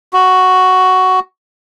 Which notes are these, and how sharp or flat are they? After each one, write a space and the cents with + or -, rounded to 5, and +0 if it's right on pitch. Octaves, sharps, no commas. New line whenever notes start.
F#4 +5